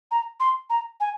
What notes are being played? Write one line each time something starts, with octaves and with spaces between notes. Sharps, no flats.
A#5
C6
A#5
G#5